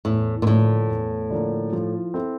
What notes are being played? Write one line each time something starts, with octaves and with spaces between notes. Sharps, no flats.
E2 A2
A#2
A2 D3 F3 A#3
E2
D3 F3 A#3
F3
C4 E4 A4